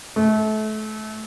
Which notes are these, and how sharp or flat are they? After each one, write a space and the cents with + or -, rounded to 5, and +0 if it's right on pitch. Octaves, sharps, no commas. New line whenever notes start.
A3 -30